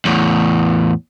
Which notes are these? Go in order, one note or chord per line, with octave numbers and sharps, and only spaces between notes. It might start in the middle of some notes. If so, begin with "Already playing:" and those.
E2 A2